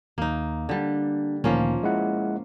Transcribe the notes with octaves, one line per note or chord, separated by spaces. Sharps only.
D#2 A#3 D#4
D3 G3 D4
D2 A#2 D#3 F3 A#3 C#4
G#3 E4 F#5